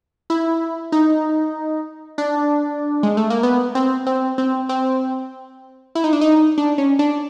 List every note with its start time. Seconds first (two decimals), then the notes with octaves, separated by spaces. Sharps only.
0.30 E4
0.92 D#4
2.18 D4
3.03 G#3
3.17 A3
3.30 A#3
3.43 B3
3.75 C4
4.06 C4
4.38 C4
4.69 C4
5.95 E4
6.04 D#4
6.13 D4
6.21 D#4
6.58 D4
6.78 C#4
6.99 D4